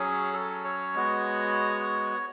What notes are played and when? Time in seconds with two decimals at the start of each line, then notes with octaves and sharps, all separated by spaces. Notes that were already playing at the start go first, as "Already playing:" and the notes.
Already playing: F#3 C#4 G#4
0.33 A4
0.64 C#5
0.95 G#3 B3 F#4